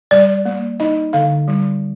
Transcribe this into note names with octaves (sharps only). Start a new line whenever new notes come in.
G3 D5
A#3
D#4 D#5
D3 F5
G3